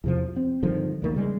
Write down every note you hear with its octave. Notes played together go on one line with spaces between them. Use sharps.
E2 C3 F3
C4
G2 D3 D#3 F3
D2 D#3 A#3
C#3 G3 G#3